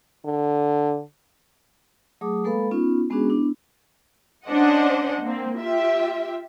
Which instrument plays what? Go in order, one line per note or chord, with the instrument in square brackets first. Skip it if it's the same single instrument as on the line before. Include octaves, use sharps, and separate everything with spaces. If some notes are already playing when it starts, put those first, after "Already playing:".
[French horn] D3
[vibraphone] F#3 A3 G#4 D6 D#6
G#3 A#3 A4 B4 F5 B5
B3 C#4 D#4 F4
G#3 B3 C#4 D4 F#4 G#4
B3 D4 E4
[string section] C#4 D4 C5 D#5 F#5
A#3 C4
F4 G4 E5